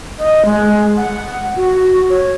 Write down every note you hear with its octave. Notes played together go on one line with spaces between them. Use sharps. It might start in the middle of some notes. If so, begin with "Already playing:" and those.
D#5
G#3
F#5
F#4
C#5